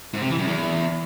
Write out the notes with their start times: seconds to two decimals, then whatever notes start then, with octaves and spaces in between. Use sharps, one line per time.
0.14 G#2
0.22 C3
0.30 E3
0.39 F#2
0.47 E2